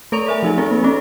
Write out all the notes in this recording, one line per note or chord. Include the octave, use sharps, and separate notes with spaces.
A3 A4 C#5 D5 C#6 F7
A#4 E5 G#5
F3 D#4 G#4
C4 G#4 A4
A#3
A#3 C4 C#4 A4